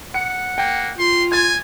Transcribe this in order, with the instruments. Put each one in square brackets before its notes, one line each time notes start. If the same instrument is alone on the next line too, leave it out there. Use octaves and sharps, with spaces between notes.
[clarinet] F#5 [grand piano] C#7
[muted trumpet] A#3 [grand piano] G5
[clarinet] F4 [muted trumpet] C6
[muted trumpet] G#5 [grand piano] G#6 A6